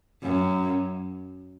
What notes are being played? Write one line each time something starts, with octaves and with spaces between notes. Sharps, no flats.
F#2